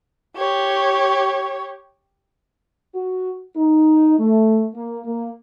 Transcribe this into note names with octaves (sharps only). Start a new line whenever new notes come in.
G4 C#5
F#4
D#4
A3
A#3
A#3